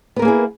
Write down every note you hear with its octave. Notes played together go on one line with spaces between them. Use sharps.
A#3 B3 E4 G#4 A#4